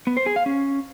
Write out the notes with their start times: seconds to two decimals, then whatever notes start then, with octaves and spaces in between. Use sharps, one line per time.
0.07 B3
0.17 C5
0.26 G#4
0.36 F5
0.46 C#4